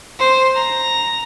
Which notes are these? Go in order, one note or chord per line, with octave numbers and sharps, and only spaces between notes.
C5
A#5